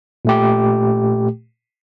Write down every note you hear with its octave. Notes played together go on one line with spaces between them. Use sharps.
A#2 A3 G4